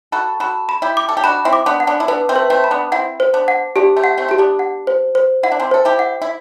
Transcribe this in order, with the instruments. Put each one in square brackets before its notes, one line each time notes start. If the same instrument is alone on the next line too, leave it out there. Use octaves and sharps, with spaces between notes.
[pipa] F#4 A4 [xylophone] B5
[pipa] F#4 A4 [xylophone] B5
[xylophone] B5
[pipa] E4 G4
[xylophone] D6
[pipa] A4
G4
[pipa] D4 F#4 [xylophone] B5
[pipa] C4 E4
[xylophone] D6
[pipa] B3 D4
[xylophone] F#5
[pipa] B3 D4
E4
[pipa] B3 D4 [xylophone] B4
[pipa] A3 C4
[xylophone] B4
[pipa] A3 C4
[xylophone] B5
[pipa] B3 D4
[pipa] C4 E4 [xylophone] F#5
[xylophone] C5
[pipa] B3 D4
[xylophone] F#5
[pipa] B3 D4 [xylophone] G4
[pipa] A3 C4
[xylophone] F#5
[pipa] A3 C4
[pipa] E4 [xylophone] G4
[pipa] B3 D4
[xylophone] F#5
C5
C5
[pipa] E4 [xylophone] F#5
[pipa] D4
C4 E4
[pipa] A4 [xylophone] C5
[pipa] E4 G4
[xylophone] F#5
[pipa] E4